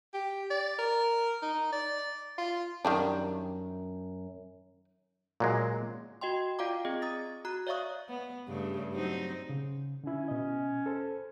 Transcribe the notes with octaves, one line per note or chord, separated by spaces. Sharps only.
G4
D5
A#4
D#4
D5
F4
F#2 D#3 G3 D4
A#2 F#3 G#3
F#4 D#5 G5 C6
F4 D5 F5 G5 A#5 D6
C4 G#4 D#5
A#5 D#6 A6
F#4 A#5 F#6
C#5 D5 E5 F5 C#6 D#6
B3
G2 C#3 A3
F#3 C4 D#4
C#3
D3 C#4 E4
B2 D#5
A4 C5